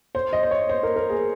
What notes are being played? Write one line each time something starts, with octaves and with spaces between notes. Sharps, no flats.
C5
D#5
C5
C#5
C5
A#4
A#4
G#4